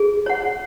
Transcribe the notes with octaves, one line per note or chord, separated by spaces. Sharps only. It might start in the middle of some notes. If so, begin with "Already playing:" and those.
Already playing: G#4
C#5 F#5